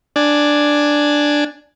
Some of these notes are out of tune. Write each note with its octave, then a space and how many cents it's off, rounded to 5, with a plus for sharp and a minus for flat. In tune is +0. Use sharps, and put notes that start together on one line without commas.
D4 +0 D5 +0 G#5 +0